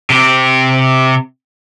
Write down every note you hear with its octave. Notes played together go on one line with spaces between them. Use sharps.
C3 G4